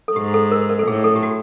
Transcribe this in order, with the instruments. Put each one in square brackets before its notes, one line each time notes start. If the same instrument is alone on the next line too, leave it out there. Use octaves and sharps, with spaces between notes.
[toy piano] A4
[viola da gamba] G#2 [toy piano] G4
[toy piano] A4
A#4
A#4
A4
[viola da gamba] A2 [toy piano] G#4
[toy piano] A4
G4
F#4